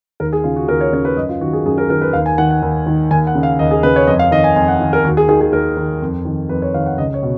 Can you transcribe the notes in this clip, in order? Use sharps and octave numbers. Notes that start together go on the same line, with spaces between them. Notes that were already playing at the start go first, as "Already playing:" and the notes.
D#2 A#4
G#4
C#3 F4
F#4
D#2 A#4
C#5
C#3 C#5
B4
F#2 D#5
F4
D#3 F#4
G#4
F#2 G#4
A#4
D#3 A#4
B4
D#2 F5
G#5
D#3 F#5
F#5
D#2
D#3
D#2 G#5
F#5
C#3
F5
D#2 D#5
G#4
C#3 B4
C#5
F2 D#5
F5
D#3 D#5
G#5
F2 G#5
F#5
D#3
A#4
D#2 F#4
G#4
D#3 G#4
G#4
D#2 A#4
D#3
F2
D#3
F2 B4
C#5
D#3 F5
F#5
C#2 D#5
C#5
B2